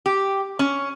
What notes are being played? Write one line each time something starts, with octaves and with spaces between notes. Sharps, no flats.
G4
C#4